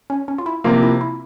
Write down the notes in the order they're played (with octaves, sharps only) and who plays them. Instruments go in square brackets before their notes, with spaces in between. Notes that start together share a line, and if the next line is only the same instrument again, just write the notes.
[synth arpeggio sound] C#4
C#4
F4
E4
[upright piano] C3 F3 A#3 [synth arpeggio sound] F4
[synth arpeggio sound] E4
E4